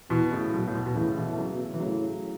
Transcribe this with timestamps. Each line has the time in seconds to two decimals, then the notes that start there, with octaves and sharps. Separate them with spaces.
0.10 B2 E3
0.31 A2 C#3
0.53 B2 F#3
0.67 A2
0.74 B2
0.86 B2
0.95 A2 C#3 E3
1.16 B2 E3
1.32 A3
1.38 C#3 F#3
1.53 B2
1.74 E3
1.80 A2 C#3 F#3